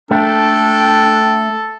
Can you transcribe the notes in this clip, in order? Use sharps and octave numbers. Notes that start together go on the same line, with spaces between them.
A3 D4 A4 G5